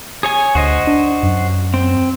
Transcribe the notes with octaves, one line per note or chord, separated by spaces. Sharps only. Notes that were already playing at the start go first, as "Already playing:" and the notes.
G#4 C#5 G#5
D2 F#4 C5 D#5
D4
F#2
C4